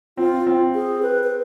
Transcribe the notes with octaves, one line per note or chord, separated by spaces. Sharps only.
C4 F4
C4
G#4
B4
B4